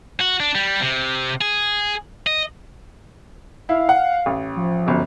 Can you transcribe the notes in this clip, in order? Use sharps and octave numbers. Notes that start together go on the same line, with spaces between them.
F#4
D4
G3
C3
G#4
D#5
E4 F5
F#5
A1
F3
G1 F#2